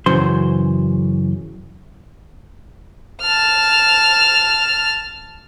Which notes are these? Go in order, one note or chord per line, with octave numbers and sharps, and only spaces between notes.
F#2 C#3 E3 C5 C6
A5 F6